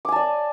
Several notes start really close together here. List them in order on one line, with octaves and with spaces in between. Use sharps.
D6 G#5 A5 D5